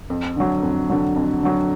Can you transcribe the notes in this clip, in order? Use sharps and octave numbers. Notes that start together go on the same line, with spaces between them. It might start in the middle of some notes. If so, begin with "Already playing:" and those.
F2
D3 F#3
F2
D3 F#3
F2
D3 F#3